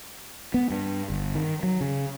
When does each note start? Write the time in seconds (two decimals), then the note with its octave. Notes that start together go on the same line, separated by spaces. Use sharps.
0.54 B3
0.71 G2
1.10 G1
1.35 D#3
1.63 F#3
1.81 C#3